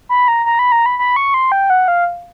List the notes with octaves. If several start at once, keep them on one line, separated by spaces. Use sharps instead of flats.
B5
A#5
A#5
B5
A#5
B5
B5
C#6
C6
G5
F#5
F5